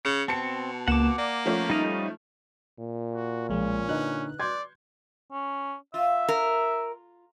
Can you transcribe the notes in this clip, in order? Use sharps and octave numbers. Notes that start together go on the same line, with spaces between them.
C#3 C#7
B2 C4 A5 C#7
C#2 A#3 F#5 D6 E7
A#3 D5
F3 A3 C#4
G3 D#4 D#5 F5
A#2
F#4
B1 F3 G#3 C#4
D3 D#4 B4 F#6
D5 C6 G6 G#6
C#4
F4 E5
A#4